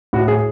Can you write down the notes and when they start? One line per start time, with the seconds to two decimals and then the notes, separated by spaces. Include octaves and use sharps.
0.13 A2 F#4
0.28 G#4